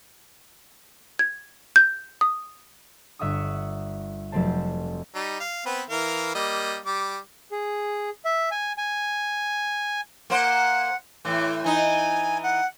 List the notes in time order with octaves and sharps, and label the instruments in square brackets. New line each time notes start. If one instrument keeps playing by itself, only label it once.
[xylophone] G#6
G6
D#6
[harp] G1 E5 F#5 C#6 D#6
F1 F#3 A3 C4 C5 A5
[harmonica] G3 D#4
F5
B3 C4 B4
E3 A#4 F5
G3 A#3 D#5
G3 D6
[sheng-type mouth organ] G#4
E5
G#5
G#5
[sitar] A#3 C5 [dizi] F#5
[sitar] A2 E3 [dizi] D6
[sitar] E3 D#4 [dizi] G#5
[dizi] F#5